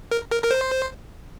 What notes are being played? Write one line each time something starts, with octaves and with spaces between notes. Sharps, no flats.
A#4
A#4
A#4
C5